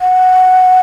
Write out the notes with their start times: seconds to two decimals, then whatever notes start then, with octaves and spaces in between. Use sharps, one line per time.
0.01 F#5